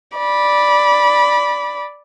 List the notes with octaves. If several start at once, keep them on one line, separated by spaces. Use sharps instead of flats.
D5 B5